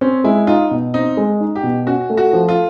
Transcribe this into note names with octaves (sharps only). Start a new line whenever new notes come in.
C4 C#4
G#3 E4
D#4 F4
B2
C4 D#4
G#3
D#4
G4
B2
C#4 F#4
A3
F#4
F3
F4